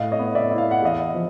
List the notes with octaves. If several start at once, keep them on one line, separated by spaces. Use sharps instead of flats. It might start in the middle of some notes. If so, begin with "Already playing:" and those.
Already playing: A2 D#5 F5
C#5 D#5
B3
D5 E5
E4
F5
F#5
E2 D#5 F5
F3